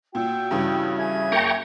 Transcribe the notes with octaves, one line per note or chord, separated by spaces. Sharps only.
A#2 F#4 G5 E6
G2 C#3 E3
G#4 E5 G#6
F#2 A#3 G5 A#5 C#6